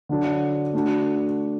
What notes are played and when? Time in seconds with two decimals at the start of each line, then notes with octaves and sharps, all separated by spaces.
0.09 D3 F#3 D4
0.73 A3 D4 F#4